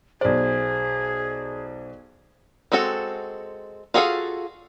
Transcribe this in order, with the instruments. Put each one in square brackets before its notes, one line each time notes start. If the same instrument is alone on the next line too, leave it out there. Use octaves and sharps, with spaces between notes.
[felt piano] B1 D5 [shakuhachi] G#4 [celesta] C5
[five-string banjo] G#3 C4 F#4 A4
F4 F#4 G#4 A4 F5